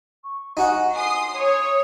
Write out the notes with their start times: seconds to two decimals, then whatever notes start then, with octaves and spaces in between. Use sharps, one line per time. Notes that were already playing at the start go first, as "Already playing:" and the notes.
0.24 C#6
0.57 D#4 F#4 F#5 G#5
0.95 G#5 C6 D#6 C7
1.36 C#5 D#6